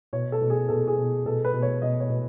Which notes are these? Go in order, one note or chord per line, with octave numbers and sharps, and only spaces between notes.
B2 C#5
A4
B2
G#4
B2 A4
G#4
B2
B2 A4
B4
B2
C#5
B2 D#5
C#5
B2